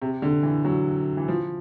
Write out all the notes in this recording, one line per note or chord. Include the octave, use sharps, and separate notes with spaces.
C3
D3
E3
F#3
E3
F3